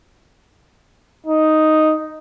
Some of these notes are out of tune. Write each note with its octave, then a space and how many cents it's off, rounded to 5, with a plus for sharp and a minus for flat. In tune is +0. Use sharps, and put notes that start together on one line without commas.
D#4 +0